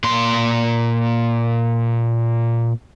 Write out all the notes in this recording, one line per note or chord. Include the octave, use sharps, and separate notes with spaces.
A#2 C6